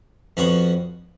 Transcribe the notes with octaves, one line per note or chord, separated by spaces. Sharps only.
F2 F3 B3 F#4 C#5